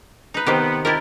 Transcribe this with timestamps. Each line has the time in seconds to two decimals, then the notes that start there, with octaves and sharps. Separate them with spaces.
0.34 D#4 B4
0.47 C3 D#3 B3 G4
0.85 D#3 E4 F4 G4 A#4 A5